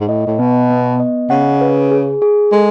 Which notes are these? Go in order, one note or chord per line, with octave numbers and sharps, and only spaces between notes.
G#2
A2 D#5
A2
B2 B3
B3
D#5
C#3 F#5
B4
G#4
G#4
G#3 A4